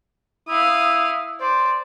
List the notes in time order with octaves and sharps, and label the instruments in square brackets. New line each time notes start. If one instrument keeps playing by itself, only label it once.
[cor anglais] E4 [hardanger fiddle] F5 D#6
[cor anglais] C5 [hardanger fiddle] D5